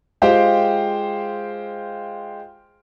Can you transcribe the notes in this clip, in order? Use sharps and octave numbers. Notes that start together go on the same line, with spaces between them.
G#3 F4 G4 C5 F5 G5